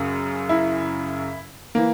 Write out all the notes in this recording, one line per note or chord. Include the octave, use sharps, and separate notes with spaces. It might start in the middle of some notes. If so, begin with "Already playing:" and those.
Already playing: F#2 C#3
E4
E3 A#3